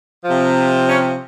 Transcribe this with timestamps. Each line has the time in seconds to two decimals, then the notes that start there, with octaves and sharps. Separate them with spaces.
0.25 C3 F3
0.88 C#4